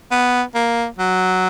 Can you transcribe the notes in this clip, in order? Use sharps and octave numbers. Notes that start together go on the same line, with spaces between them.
B3
A#3
F#3